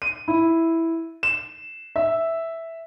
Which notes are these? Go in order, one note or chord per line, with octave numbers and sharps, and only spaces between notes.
D#7
E4
E7
E5